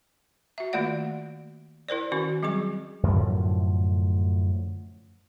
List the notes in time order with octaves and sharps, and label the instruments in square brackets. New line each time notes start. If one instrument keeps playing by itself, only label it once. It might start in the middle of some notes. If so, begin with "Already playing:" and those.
[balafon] F#4 E5
D#3 A3 A#3 F4 D5 F#5
E4 A#4 C5 D5
D#3 C#4 F#4
F#3 G3 C4 G#4 C#6
[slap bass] F#2 A2 D3 F3